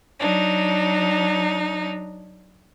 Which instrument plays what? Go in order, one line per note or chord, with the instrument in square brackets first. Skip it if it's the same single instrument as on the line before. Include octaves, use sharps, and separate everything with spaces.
[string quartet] F#3 D4 D#4